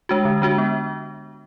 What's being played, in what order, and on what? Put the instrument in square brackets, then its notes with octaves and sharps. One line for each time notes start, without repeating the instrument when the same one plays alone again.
[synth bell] G#3 D4 F#4
D3
G#3 D4 F#4
B3